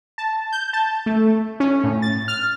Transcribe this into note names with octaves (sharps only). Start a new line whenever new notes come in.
A5
G6
A5
A3
C#4
A2
A6
F6